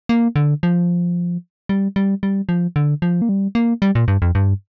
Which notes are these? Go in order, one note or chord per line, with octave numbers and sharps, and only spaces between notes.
A#3
D3
F3
G3
G3
G3
F3
D3
F3
A#3
G3
A#3
G3
A#2
G2
F2
G2